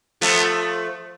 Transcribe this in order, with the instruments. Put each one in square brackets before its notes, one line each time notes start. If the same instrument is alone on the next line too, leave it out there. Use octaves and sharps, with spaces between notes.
[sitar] F3 A3 [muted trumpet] B3